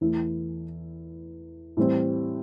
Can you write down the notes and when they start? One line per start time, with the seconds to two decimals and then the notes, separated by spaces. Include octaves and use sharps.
0.01 E2 E3 A3 E4
1.77 A2 E3 G3 C4